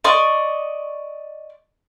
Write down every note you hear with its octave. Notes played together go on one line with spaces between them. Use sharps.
D5 D#5 C#6